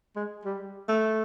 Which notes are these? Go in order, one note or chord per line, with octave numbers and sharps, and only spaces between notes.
G#3
G3
A3